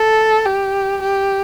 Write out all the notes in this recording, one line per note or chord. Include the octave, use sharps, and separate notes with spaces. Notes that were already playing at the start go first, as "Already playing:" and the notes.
Already playing: A4
G4
G4